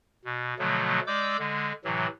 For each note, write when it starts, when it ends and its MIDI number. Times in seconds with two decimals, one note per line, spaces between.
0.25 0.54 47
0.59 1.00 47
0.59 1.00 50
0.59 1.00 53
0.59 1.00 54
0.59 1.00 57
1.07 1.37 56
1.07 1.37 74
1.07 1.37 86
1.07 1.37 88
1.07 1.37 91
1.39 1.73 50
1.39 1.73 56
1.84 2.07 45
1.84 2.07 48
1.84 2.07 52
1.84 2.07 54